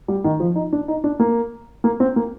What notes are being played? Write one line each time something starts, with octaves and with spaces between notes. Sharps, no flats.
G3
D#3
F3
D#4
D4
D#4
D4
A#3
A#3
C4
A#3